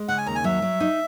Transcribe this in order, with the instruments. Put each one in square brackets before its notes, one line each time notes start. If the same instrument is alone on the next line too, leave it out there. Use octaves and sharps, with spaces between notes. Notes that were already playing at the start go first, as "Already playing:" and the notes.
Already playing: [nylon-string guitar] G#3
[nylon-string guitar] C#3 [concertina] F#5
[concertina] G#5
[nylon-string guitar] D#2 [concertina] A#5
[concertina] G#5
[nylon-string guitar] F#3 [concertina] E5
[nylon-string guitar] F#3
D#4